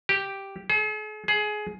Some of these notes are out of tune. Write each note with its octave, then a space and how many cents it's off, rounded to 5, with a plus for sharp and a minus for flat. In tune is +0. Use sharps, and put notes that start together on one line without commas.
G4 +0
G#4 +45
G#4 +20